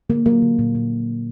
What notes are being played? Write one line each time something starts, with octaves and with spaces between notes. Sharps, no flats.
D3 A#3
F#3 A#3
D3
A#2
A#2